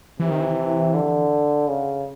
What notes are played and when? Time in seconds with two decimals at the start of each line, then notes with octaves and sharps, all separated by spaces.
0.20 C3 E3
0.30 D#3
0.41 E3
0.94 D3
1.68 C#3